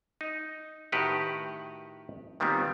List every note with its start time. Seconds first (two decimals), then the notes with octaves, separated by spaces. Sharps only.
0.21 D#4
0.92 A2 D#3 F#4 G4 B4 F#5
2.40 A#2 D#3 G3 B3 C4